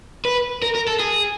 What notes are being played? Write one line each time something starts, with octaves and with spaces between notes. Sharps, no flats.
B4
A#4
A#4
A4
G#4